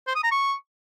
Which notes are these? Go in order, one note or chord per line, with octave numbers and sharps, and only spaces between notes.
C5
D#6
A#5
C#6